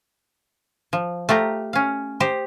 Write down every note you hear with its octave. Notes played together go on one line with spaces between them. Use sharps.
F3
A3 F4 G4 A#5
C#4 F5
G4 C5 D#5